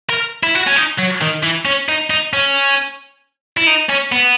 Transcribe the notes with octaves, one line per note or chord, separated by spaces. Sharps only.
A#4
E4
F#4
C#4
D#4
F#3
D#3
E3
C#4
D#4
D#4
C#4
E4
D#4
C#4
B3